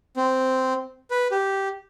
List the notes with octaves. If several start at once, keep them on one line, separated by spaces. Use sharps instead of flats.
C4
B4
G4